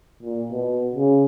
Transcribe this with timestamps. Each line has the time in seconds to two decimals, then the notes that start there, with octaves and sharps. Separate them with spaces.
0.22 A#2
0.52 B2
0.96 C#3